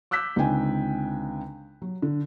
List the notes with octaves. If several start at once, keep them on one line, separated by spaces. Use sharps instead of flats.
D6 E6 F#6 G6 B6
C#2 D3 C4 D#4 G5 G#5
F#3
D3